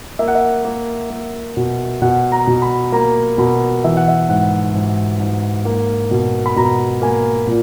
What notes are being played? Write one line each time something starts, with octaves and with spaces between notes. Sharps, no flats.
A#3 E5
F#5
E5
A#3
A#3
B2
B2 F#5
A#5
B2
B5
A#3 A#5
B2 B5
E3 E5
F#5
E5
G#2 F#5
G#2
G#2
A#3
B2
B5
B2 A#5
A#3 G#5
A#2